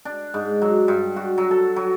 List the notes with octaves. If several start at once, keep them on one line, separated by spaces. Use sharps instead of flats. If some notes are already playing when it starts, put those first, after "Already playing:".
D4
G#2
F#3
G2
F#4
F#3
A4
F#3